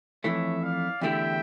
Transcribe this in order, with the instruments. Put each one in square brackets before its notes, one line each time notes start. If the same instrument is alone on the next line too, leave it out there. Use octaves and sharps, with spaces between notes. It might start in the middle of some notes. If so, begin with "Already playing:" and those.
[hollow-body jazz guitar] F2 E3 A3 [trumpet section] C#5 E5
[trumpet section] D5 F5
[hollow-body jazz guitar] E2 D3 A3 E4 G4 [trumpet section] E5 G5